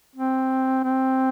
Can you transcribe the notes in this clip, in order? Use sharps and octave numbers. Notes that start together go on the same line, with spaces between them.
C4
C4